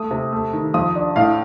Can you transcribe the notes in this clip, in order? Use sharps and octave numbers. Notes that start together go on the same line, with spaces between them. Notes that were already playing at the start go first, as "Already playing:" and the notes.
Already playing: A3 D#6
C3
A3
D#3
F2 D#6
D4
A2 F5